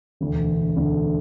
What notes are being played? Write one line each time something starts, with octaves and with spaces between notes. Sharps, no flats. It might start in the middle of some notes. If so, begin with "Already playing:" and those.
E1 D2 D3
E1 D2 D3